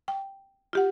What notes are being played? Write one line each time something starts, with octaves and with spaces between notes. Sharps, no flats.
G5
F4 G4 F#5